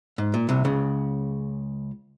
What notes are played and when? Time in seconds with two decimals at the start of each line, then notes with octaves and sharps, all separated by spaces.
0.18 G#2
0.34 A#2
0.49 C2 C3
0.65 C#2 C#3